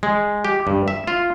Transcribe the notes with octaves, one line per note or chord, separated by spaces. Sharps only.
G#3
G4
G2
E5
F4